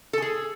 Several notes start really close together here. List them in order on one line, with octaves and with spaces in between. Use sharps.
A4 G#5 G#4